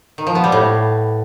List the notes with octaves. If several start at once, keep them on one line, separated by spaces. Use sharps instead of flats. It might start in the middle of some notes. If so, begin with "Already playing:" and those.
D#3
F3
B3
G3
A2